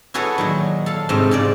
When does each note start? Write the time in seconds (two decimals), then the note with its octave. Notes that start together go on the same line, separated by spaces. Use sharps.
0.14 E4 F#4 G#4 A4 B4 C#5
0.38 A#2 D#3 F#3
0.86 A4 F5
1.09 G#2 C3 A3 C4 F4 F5
1.31 G#2 C#3 D5